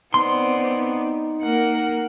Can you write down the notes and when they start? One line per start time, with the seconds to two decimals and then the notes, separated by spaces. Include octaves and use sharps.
0.14 B3 C4 D#4 D5 C6
1.42 A#3 A#4 F#5